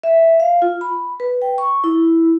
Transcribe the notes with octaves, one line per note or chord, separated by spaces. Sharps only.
E5
F5
F4
B5
B4
G5
C#6
E4